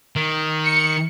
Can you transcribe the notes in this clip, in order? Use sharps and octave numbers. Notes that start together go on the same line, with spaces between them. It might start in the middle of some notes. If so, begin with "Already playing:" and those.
D#3
C#7